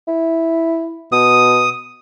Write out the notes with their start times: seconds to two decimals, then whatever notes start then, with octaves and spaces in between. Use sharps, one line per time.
0.08 E4
1.12 B2 D#6